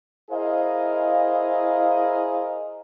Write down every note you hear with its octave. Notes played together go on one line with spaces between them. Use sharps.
E4 G#4 A#4 C5 D#5 F5